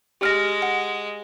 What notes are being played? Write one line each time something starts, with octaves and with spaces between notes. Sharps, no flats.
G#3 G4 F6 A#6
F#5